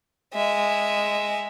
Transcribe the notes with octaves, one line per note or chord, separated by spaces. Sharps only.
G#3 E5